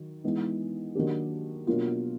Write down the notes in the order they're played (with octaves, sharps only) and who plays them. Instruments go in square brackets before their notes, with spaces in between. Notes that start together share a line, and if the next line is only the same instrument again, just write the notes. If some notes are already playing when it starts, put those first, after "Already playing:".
Already playing: [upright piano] D#3 F#3
E3 G#3 B3 D#4
D#3 F#3 A#3 D4 G4
B2 F#3 A#3 D4 F4